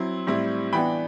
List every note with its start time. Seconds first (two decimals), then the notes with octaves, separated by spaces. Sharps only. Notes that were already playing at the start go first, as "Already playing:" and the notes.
Already playing: F#3 C4 E4 C6
0.27 A2 G3 C4 E4
0.73 E3 B3 D4 G5 B5